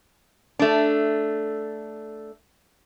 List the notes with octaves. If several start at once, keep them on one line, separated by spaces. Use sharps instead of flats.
A3 D4